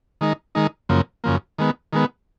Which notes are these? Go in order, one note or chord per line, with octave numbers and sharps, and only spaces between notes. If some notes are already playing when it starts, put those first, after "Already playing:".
D#3 G#3 D#4
D#3 G#3 D#4
F#2 C#3 F3 A#3
F#2 C#3 F3 A#3
D#3 G#3 B3
D#3 G#3 B3